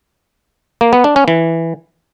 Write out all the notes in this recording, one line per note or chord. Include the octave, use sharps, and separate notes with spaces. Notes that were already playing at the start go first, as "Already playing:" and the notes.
A#3
B3
D4
C#4
E3